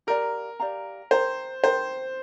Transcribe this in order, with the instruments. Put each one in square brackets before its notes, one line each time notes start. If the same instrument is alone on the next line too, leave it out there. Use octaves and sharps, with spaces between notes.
[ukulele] G4 D5 F5 A#5 [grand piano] A#4
[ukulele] G4 D5 F5 A#5
[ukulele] A#4 G5 A#5 [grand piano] C5
[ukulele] A#4 G5 A#5 [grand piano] C5